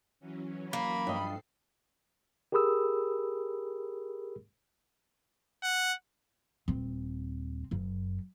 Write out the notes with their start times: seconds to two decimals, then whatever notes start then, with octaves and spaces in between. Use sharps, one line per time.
0.20 E3 F#3 C#4
0.73 A#3 B5
1.07 G2 F3 A4 D#5 C7
2.52 G4 G#4 A#4 B5 D#6 E6
5.63 F#5
6.68 D#1 C4
7.71 F#1 F#2